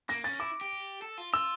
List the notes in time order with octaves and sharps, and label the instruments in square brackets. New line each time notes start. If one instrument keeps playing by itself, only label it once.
[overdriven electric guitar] A#3 [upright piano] A#6
[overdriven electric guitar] C#4 [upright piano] A6
[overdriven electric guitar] E4 [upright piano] D6
[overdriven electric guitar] G4
A4
F4
[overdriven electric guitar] F4 [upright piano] E6